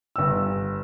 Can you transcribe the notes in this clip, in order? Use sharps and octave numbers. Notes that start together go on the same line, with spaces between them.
G1 E6